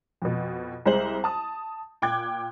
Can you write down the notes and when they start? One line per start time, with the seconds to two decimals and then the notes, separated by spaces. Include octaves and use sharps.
0.22 F2 B2
0.86 C2 G#3 C5 F#7
1.24 A5 D#6
2.02 A#2 G5 D6 F#6 G#6